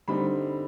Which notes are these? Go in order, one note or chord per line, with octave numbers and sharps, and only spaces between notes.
D3 G3 C4 D#4 B5